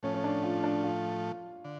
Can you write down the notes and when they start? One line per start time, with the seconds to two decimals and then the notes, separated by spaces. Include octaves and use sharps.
0.03 A2 F3 A3 C#4
0.14 C#4
0.24 D4
0.44 F4
0.64 D4
0.84 F4
1.65 D3